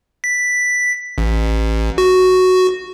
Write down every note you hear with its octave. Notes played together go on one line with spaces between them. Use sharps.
B6
A1
F#4